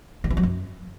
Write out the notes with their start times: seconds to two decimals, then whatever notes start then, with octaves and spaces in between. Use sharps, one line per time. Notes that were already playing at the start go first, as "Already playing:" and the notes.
0.24 D3
0.30 E3
0.37 F#3
0.43 F#2